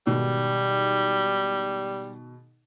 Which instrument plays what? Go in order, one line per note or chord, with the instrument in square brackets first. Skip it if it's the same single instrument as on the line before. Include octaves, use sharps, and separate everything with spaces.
[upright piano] G#2 B2 D#3 [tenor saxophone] G3